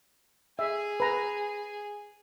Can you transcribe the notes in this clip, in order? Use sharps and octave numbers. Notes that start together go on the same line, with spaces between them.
G#4 E5
B4 A#5